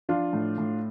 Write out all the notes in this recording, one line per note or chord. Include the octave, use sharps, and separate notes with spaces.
F3 D4 F4
A2
A2